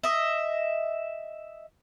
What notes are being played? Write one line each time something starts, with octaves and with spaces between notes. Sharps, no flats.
D#5 E5